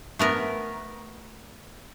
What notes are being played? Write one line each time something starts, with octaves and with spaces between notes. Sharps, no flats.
A3 B3 A#4